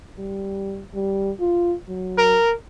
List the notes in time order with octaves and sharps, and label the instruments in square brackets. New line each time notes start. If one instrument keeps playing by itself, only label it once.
[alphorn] G3
G3
F4
F#3
[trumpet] A#4